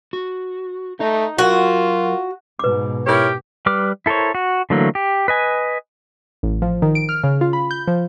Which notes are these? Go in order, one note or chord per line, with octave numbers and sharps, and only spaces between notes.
F#4
A3 D#4 D#5
F#3 F4 F#4 A#4
G#2 B2 B4 D6
E4 G4 A#4 C#5
G3 B4 D6 F6
E4 A4 A#4 C5 C#5
F#4
D3 E3 F#3 A3 A#3
G4
B4 D#5 G#5
A1
F3
D#3
D7
F6
C#3
F4
B5
G6
F3